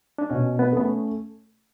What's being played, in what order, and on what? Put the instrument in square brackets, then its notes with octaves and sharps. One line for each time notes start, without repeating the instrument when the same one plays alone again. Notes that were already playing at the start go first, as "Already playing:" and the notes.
[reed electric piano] D4
[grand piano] B2 [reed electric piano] C#4
[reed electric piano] B3
[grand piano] A3 C#4 [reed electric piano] B3